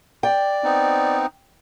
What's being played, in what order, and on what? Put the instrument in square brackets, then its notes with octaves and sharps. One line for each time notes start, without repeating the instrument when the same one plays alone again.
[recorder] D5 [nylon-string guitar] G5
[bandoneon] B3 C4 D#4